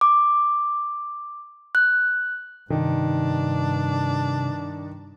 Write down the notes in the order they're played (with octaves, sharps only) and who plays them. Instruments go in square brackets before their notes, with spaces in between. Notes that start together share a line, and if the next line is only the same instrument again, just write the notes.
[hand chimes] D6
F#6
[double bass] G2 [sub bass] C3 [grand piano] D#3 [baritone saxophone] D4